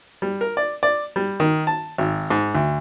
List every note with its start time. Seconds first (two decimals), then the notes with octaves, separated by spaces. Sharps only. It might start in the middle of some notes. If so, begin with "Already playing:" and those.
0.22 G3
0.41 A#4
0.57 D5
0.83 D5
1.16 G3
1.40 D#3
1.67 A5
1.98 G#1
2.30 G#2
2.55 D2